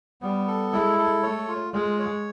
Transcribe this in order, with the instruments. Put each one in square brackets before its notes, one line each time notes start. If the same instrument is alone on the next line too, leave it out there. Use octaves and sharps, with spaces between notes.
[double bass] G3 [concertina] B3
[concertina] A4
[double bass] G#3 [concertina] E4
[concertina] A4
[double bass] A3 [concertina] C#5
[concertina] F4
[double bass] G#3 [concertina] F4
[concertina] C#5